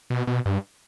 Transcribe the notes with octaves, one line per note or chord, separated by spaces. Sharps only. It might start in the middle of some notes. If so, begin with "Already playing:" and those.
B2
B2
G2